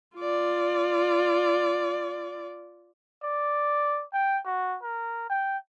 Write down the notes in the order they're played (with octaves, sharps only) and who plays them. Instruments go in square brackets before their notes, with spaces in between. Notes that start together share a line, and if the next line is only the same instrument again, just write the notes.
[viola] F4 D5
[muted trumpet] D5
G5
F#4
A#4
G5